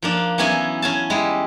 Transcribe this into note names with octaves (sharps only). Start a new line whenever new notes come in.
F3 A#3 D4
E3 F#3 B3 C#4 E4 G#5
C#4 G#5 A5
G3 G#3 E4